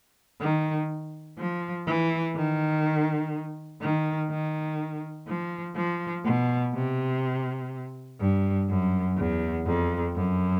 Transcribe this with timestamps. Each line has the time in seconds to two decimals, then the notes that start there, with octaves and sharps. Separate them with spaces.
0.40 D#3
1.38 F3
1.86 E3
2.35 D#3
3.81 D#3
4.30 D#3
5.27 F3
5.76 F3
6.24 B2
6.74 C3
8.19 G2
8.69 F#2
9.17 E2
9.66 F2
10.15 F#2